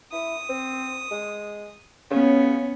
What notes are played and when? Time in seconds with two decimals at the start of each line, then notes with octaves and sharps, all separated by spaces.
0.12 E4 D#6
0.49 C4
1.11 G#3
2.11 C#3 B3 C#4